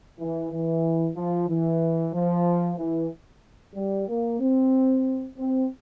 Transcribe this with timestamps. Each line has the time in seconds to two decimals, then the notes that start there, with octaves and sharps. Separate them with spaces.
0.19 E3
0.51 E3
1.16 F3
1.48 E3
2.13 F3
2.78 E3
3.75 G3
4.08 A#3
4.40 C4
5.38 C4